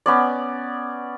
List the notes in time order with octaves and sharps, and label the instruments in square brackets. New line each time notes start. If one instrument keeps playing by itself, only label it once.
[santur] B3 C#4 D5